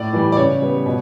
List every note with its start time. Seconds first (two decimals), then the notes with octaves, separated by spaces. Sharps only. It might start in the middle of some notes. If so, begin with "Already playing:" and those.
Already playing: A2 D5
0.13 E3 G3
0.32 D5
0.37 C#3 C#5
0.62 G3 B3
0.86 B2